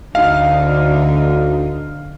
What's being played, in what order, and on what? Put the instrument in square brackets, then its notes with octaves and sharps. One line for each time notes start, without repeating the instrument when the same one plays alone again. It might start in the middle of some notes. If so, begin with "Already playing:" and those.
[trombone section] D2 [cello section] D3 D4 D#4 [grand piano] F5